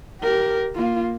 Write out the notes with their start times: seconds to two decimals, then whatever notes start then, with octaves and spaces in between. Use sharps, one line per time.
0.21 G4 A#4
0.75 A#3 F4